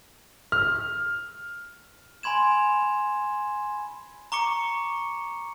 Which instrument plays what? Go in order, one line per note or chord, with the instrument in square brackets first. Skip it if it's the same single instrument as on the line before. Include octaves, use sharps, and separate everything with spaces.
[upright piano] F6
[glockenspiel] G#5 B5 C6 G#6 E7
A#5 C#6 D6 C#7